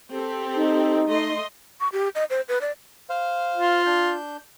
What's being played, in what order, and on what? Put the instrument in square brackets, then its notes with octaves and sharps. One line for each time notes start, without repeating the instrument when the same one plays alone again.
[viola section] C4 G4 A4
[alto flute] D#4
[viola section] A3 D#5 C6
[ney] C#6
G4
D#5
C5
B4
D5
[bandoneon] C5 F5
[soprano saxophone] F4
[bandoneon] D4 G6